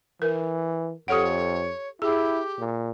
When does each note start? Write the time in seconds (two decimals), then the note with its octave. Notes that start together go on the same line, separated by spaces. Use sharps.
0.22 E3 A#4
1.08 F2 G4 A4 C#5 F#5
2.02 E4 G4 G#4
2.59 A#2